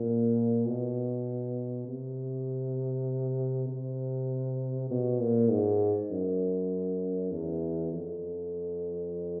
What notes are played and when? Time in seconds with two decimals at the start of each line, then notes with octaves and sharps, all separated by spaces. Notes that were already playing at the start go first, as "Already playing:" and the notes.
Already playing: A#2
0.67 B2
1.89 C3
3.69 C3
4.91 B2
5.20 A#2
5.50 G#2
6.11 F#2
7.32 E2
7.93 F2